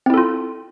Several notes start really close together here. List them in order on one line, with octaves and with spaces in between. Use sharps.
C4 E4 A4 F4